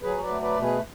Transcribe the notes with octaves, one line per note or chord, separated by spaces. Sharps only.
F#3 G#4 B4
C#5
B4 D5
A3
B4 D5
B2
G#4 B4